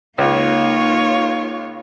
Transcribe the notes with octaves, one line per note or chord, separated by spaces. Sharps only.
C#2 A#3 D#4 F4 C#5